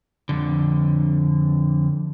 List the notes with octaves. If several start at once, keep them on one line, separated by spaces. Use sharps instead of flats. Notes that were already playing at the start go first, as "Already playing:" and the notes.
F2 D3